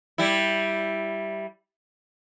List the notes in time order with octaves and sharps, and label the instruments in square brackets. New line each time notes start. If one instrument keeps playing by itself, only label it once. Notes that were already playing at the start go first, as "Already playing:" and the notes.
[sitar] G3 E4